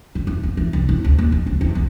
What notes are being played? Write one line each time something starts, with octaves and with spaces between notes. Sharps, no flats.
D3
E2
E2
E3
C2
E4
D2
D#2
F3
C#2
E2
B1